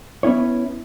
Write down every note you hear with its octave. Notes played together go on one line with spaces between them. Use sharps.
B3 C#4 E4 C#5